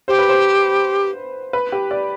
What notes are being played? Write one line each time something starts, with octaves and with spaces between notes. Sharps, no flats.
G4 C5
B4
C5
B4
G4
D5